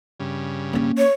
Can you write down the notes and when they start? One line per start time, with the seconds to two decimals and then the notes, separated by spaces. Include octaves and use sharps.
0.20 G2 C#3
0.73 A#3 C#4
0.98 C#5